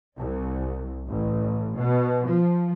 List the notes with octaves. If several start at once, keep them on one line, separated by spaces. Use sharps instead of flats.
C2
A1
B2
F3